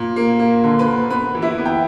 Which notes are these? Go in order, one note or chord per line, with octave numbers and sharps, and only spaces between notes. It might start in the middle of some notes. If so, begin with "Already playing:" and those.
Already playing: A#2
A#3
A#3
D3
B4 B5
A#3
B3 B4 B5
E3
E4 E5
B3
G5